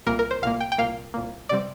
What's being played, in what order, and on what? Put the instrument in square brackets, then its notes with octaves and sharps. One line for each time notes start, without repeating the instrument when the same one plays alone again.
[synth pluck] C2 A#2 A#3 A#4
A#4
C5
C2 A#2 A#3 F5
G5
G5
C2 A#2 A#3 F5
C2 A#2 A#3
C3 G3 C4 D5